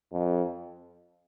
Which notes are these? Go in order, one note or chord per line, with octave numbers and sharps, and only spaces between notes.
F2